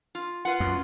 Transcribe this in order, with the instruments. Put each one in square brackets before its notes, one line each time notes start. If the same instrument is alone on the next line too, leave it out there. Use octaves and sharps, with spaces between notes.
[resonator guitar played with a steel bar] F4
[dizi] F4 [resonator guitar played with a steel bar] B4 F#5
[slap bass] F#2